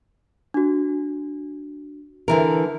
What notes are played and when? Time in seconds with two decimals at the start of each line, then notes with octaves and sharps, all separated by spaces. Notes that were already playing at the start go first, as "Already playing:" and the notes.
0.54 D4 F#4
2.28 D3 E3 A#4